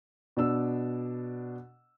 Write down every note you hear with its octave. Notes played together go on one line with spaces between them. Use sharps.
B2 D4 E6